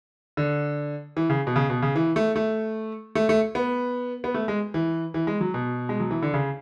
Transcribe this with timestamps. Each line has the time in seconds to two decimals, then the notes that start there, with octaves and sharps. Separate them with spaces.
0.37 D3
1.17 E3
1.30 C#3
1.47 B2
1.56 C#3
1.70 B2
1.82 C#3
1.96 E3
2.16 A3
2.36 A3
3.15 A3
3.29 A3
3.55 B3
4.24 B3
4.34 A3
4.48 G#3
4.74 E3
5.14 E3
5.27 G#3
5.41 F#3
5.54 B2
5.89 G#3
6.00 F#3
6.11 E3
6.22 D3
6.34 C#3